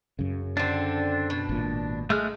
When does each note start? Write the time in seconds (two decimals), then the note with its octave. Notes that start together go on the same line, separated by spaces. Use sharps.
0.19 F#2 C#3
0.57 D3 C4 D4
1.30 B2
1.49 G#1 A#2
2.10 G#3 A3 F6 F#6